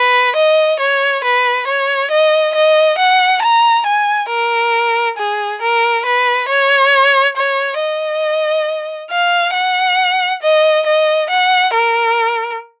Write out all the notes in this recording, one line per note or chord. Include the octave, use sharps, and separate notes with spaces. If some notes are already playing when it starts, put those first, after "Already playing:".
Already playing: B4
D#5
C#5
B4
C#5
D#5
D#5
F#5
A#5
G#5
A#4
G#4
A#4
B4
C#5
C#5
D#5
F5
F#5
D#5
D#5
F#5
A#4